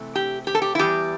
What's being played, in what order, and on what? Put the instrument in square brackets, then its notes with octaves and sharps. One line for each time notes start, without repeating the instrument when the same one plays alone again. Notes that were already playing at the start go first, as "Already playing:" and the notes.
Already playing: [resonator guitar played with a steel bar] C3 E3 A3 C4
G4
G4
A4
G4
E4
E2 E3 G3 G4